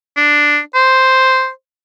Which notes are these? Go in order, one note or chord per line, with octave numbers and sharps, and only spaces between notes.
D4
C5